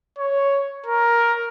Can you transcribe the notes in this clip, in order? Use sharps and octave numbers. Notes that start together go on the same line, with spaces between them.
C#5
A#4